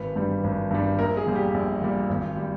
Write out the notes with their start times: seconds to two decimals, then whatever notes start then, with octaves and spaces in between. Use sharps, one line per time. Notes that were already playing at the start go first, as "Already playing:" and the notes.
Already playing: G#1 B4
0.16 G2 G3
0.44 G#1
0.71 G2 G3
0.99 A#1 A#4
1.17 G#4
1.27 A#2 G3
1.36 G4
1.54 A#1
1.82 A#2 G3
2.09 G#1
2.37 G3